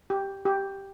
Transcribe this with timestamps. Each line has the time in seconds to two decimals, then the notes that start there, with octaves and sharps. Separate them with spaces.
0.10 G4
0.45 G4